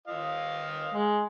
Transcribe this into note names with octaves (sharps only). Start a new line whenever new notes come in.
F4 D#5 F5
G#3